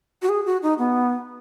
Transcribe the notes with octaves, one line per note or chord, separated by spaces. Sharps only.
F#4
G#4
F#4
D#4
B3